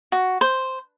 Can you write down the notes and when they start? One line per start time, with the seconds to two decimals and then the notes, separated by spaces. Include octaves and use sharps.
0.12 F#4
0.41 C5